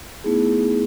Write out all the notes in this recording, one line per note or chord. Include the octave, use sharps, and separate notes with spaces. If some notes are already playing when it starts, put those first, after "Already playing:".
A3 B3 D#4 E4 G#4